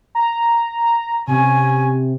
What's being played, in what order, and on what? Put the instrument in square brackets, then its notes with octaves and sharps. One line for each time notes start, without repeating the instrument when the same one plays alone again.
[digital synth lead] A#5
[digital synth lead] C3 [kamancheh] C#4 G#5